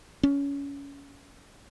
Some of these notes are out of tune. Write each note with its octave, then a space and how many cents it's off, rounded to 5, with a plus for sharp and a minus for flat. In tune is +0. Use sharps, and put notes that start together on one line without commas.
C#4 +25